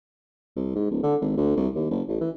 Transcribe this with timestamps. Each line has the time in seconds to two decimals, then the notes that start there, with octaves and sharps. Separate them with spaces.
0.56 C2
0.76 G#2
0.91 D1
1.03 D3
1.21 G#1
1.37 D2
1.57 C2
1.76 D#2
1.91 F#1
2.08 A1
2.21 E3